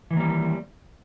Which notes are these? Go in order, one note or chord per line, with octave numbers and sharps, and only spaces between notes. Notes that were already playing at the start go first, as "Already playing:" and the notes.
D#3 E3 G3 A#3